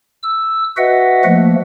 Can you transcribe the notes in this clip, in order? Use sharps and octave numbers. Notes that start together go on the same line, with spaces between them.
E6
F#4 B4 D#5 E5 F#5
F3 A3 A#3